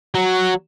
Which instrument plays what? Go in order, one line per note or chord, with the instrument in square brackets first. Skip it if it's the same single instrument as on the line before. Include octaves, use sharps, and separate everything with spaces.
[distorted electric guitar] F#3